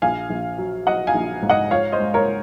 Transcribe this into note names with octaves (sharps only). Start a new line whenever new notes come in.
A#1 F5 G#5
A#1
F#3
F#3 D#5 F#5
F5 G#5
A#1
G#2
D#5 F#5
F3 C#5 F5
C5 D#5
G#3
A#4 C#5